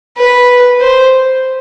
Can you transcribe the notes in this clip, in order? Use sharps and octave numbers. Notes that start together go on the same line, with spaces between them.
B4
C5